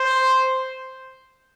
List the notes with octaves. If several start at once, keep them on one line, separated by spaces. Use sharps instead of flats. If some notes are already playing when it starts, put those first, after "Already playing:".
Already playing: C5